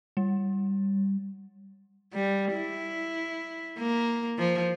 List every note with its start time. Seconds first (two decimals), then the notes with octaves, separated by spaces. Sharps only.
0.17 G3
2.13 G3
2.54 E4
3.79 A#3
4.39 F3